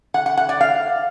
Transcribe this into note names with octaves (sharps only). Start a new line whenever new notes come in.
F#5
F#5
F#5
D5
F5